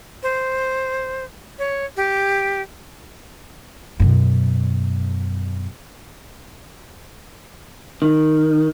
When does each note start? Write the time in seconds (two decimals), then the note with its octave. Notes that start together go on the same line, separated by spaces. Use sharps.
0.23 C5
1.59 C#5
1.97 G4
4.00 F#2 B2
8.02 D#3